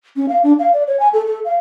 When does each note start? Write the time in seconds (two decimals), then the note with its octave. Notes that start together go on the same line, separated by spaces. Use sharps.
0.16 C#4
0.29 F5
0.44 D4
0.59 F5
0.74 D5
0.88 C#5
1.00 G#5
1.13 A4
1.26 A4
1.45 F5